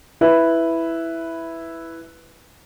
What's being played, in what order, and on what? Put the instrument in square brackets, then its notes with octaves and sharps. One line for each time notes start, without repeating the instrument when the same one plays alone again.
[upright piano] E4 B4 E5